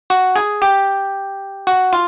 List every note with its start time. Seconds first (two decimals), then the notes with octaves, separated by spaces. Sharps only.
0.10 F#4
0.36 G#4
0.62 G4
1.67 F#4
1.93 F4